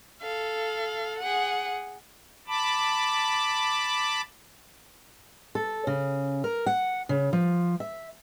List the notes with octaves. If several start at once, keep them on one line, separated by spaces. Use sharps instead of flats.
A4 F5
G#4 F#5
A5 B5 D6
A4
C#3
A#4
F#5
C#3
F3
E5